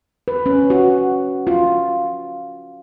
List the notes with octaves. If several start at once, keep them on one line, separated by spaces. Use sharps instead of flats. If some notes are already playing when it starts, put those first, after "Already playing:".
B4
C#4
F#4
F4